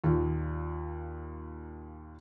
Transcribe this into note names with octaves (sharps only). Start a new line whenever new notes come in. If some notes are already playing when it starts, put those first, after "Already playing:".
D#2 A#2